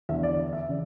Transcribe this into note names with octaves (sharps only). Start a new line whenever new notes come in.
E2 D3 E5
D5
D5
E5
C#3 E3